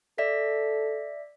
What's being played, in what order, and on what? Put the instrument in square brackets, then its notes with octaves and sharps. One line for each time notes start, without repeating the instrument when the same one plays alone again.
[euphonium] A4 [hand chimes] D5 E5 B6